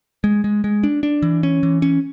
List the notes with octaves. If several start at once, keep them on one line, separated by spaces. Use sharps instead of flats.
G#3
G#3
G#3
D4
D4
E3
C#4
E3
C#4